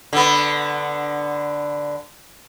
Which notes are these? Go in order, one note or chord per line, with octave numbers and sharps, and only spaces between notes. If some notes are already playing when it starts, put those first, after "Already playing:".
D3 B3